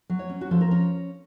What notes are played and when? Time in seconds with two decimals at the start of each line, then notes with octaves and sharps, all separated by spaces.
0.10 F#3
0.19 C#5
0.30 C#4
0.41 F#4
0.51 F3 A4
0.61 A#4
0.71 C#4 A#4